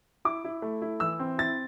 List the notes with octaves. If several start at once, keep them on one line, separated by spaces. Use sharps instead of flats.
E4 D6
E4
A3
E4
E3 E6
C4
E4 A6